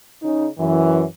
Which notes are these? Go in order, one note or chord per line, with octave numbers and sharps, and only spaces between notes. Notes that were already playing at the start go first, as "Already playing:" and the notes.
C#3 D#4
F#2 E3